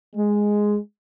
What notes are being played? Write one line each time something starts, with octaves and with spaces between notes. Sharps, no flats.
G#3